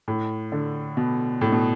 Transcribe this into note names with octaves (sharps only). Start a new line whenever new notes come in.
A2
D3
B2
A2
B2